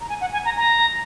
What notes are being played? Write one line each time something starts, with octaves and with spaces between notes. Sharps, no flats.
A#5
G#5
F#5
G#5
A#5
A#5